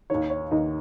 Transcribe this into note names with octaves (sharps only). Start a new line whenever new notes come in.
D#2 D#3 C#5
C#5
D#2 D#3 D#5